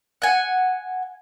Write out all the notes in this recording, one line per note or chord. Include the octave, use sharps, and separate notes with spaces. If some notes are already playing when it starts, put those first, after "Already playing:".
F#5 G#5